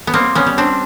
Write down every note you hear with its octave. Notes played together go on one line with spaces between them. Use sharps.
B3
G3 A#3 C4
B3 C#4
G3
C4 D4